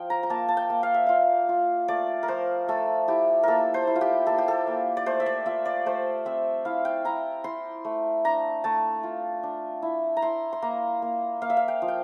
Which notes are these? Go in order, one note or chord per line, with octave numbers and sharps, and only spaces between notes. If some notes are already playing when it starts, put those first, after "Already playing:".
Already playing: F3 F4 G5
A#5
A#5
A#3 A5
A5
G5
A#3
F5
E5
F4 F5
F4
A3 D5
A#4
F3 C5
A3 A4
E4 G4
A#3 A4 A#4
C5
E4
F4
G4
A#3 A4
G4
A4
A#3
D5
A3 C5
E5
D5
F4 E5
D5
A3 C5
C4 E5
E4 F5
G5
E4 A#5
E4 C6
A3
D4 A#5
A3 A5
F4
D4
E4
A#5
E4 C6
C6
A#3 A#5
A#3
A#3 F5
E5
F5
G5
F3
G5